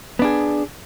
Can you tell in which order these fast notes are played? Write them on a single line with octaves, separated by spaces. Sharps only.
B3 D4 G#4